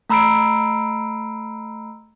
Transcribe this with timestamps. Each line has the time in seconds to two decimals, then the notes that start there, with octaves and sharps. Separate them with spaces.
0.10 A3 A#5 B5 E6 C7 D7